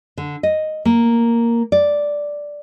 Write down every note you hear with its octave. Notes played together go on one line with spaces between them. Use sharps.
D3
D#5
A#3
D5